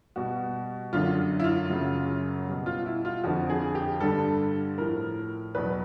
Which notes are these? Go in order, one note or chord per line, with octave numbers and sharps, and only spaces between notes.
B2 G3 F#4
F#2 D3 F#3 F4
E4
F4
F#2 C#3 F#3
B2 G3
F4
E4
F4
F2 D3 F3 F#4
G#4
G4
G2 D3 G3 A4
A2 F3 A#4
E2 B2 F#3 B4